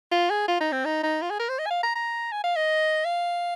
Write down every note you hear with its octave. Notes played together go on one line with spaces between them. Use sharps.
F4
G#4
F4
D#4
C4
D#4
D#4
F4
G#4
A#4
C5
D#5
G#5
F5
A#5
A#5
G#5
F5
D#5
F5